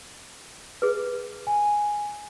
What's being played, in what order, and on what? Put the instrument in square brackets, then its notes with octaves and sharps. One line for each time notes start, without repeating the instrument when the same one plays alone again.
[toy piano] G#4 B4
[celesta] G#5